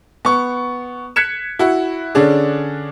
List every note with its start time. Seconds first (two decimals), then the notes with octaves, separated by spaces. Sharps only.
0.25 B3 C#6
1.16 F#6 G#6 B6 C#7 E7
1.59 E4 F#4
2.15 D3 C#4 D4 G#4